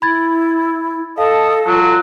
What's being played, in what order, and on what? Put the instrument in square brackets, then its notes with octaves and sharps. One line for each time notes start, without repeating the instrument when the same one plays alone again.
[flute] E4 [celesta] B5 G#6 A6
[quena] A4 [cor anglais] D#5 [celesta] F5 [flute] A5
[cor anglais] F#3 [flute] F4